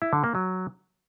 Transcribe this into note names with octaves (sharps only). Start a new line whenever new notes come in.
E4
D3
A#3
F#3